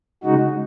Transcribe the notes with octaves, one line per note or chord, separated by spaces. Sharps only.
C#3 G#3 D#4 F#4